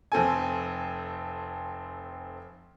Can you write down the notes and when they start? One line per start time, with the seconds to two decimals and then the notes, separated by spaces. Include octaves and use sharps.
0.12 F1 C4 A4 G#5